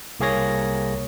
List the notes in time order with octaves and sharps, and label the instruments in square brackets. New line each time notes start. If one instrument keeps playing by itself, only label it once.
[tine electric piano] C2 A#3 G#4 C#5 A#6